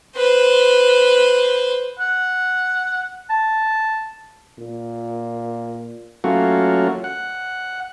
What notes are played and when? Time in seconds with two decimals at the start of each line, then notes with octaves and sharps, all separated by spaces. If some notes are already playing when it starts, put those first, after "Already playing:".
0.16 B4 C5
1.99 F#5
3.30 A5
4.59 A#2
6.24 F#3 A3 A#3 C#4 F4 F#4
7.04 F#5